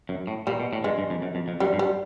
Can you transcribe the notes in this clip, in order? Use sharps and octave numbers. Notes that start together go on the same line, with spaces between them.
F#2
A2
A#2 G3
B2
A2
G2 G#3
G2
F2
F#2
F2
F2
F#2 G3
G2
G3